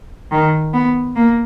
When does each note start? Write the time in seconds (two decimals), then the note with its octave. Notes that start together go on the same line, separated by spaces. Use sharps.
0.32 D#3
0.74 B3
1.16 A#3